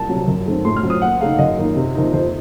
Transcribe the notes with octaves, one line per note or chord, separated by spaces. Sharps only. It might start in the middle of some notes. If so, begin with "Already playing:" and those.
Already playing: C2 A5
C3 F#3
F#2
D#3 A3 C4
A2 C6
F6
F#3 C4
D#6
D#2 F#5
C#3 A3 D#4 F5
F#2 D#5
D#3 A#3 D#4
C3
F3 A#3 D#4
F2 C5